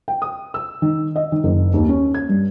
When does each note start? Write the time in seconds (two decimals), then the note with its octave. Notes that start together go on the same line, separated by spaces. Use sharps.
0.08 G5
0.22 D#6
0.54 E6
0.82 D#3
1.16 D#5
1.32 D#3
1.44 F#1
1.74 D#2
1.89 C#4
2.15 G#6
2.29 G2